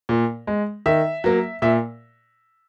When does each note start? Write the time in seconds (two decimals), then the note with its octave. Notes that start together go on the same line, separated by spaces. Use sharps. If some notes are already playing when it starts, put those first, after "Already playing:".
0.09 A#2
0.47 G#3
0.86 D#3 E5
1.24 F#3 A#3
1.62 A#2 E5